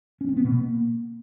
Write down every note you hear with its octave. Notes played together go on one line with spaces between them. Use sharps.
C#4
C4
B3
B2
A#3